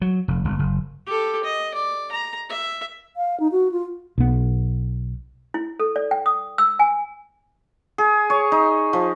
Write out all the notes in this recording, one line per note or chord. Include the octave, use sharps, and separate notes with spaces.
F#3
F1
G1
F#1
G4 A4
D#5
D5
A#5
E5
F5
D#4
F#4
F4
B1 B3
E4
A4
D5
G5
D#6
E6
G#5
G#4
C#5
D#4
F3